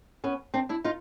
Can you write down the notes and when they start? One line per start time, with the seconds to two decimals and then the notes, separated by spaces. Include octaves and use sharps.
0.24 B3 C#4
0.54 C4 D4
0.69 D4 E4
0.84 D#4 F4